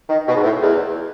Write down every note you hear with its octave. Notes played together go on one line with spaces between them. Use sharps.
D#3
B2
G#2
A2
E2